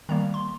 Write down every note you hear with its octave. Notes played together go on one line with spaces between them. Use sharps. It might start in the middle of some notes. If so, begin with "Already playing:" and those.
D#3 G3 A#3 A#5
C6